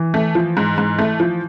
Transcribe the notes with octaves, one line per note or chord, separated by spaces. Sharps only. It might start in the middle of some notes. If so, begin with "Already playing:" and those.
Already playing: E3
A3
F3
G#2
G#2
A3
F3